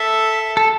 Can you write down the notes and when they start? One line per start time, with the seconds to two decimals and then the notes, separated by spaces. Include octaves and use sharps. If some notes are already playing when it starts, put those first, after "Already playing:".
Already playing: A4 E5
0.57 A4